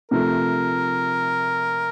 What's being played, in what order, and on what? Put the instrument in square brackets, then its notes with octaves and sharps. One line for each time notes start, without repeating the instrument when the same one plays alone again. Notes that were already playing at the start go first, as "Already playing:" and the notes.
[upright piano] C3 F3 A3 [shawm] A#4